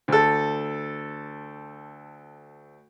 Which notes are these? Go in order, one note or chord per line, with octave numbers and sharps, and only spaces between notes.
D2 A4